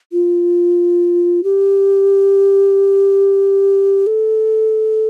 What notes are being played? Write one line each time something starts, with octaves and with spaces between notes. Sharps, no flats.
F4
G4
A4